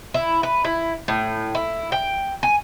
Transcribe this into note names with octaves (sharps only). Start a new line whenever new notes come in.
E4
B4
E4
A2
E4
G5
G#5